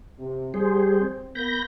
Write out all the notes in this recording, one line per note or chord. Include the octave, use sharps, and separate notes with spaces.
C3
G3 G4 G#4 C5
C4
A#3 B3 B5 G6 A#6